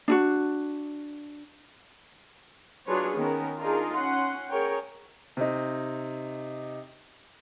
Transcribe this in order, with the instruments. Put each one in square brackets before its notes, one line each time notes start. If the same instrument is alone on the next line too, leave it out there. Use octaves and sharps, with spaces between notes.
[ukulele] D4 E4 F#4
[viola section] F#3 D4 F4 G#4 B4 C#5
D#3 B3 C#4 A#4
D4 D#4 F4 G#4 A#4
C#4 F#5 C6
G#4 A#4 C#5 G5
[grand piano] C3 D#4